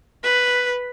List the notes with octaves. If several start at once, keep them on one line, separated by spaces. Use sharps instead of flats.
B4